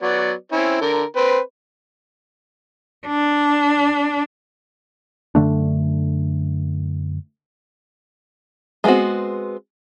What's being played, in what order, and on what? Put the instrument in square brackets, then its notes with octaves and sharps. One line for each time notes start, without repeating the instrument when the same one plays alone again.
[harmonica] F#3 B3 D5
C4 C#4 E4
D3 A#4
C4 B4 C5
[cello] D4
[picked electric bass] F#2 D3 A3 D4
[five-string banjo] G#3 A3 B3 C4 F#4